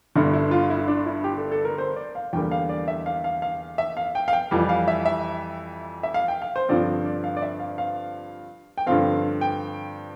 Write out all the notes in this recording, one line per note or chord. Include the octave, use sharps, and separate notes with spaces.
G1 G2 D3 E4
E4
F4
E4
D4
E4
G4
A4
A4
A#4
C5
D5
F5
E2 D3 G3 A#3 G5
F5
D5
E5
F5
F5
F5
E5
F5
G5
F5
G5
F2 E3 G3
F5
E5
E5
E5
F5
G5
F5
C5
G2 D3 F3 C4 D5
D5
F5
D5
E5
F5
F5
G5
G2 D3 F3 C4 F5
G5